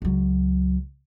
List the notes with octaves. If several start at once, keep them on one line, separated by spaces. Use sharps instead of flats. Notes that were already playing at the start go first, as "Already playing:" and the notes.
C#2 F#3